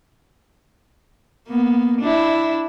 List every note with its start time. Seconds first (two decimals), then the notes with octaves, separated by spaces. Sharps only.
1.48 A#3 B3
2.01 D4 E4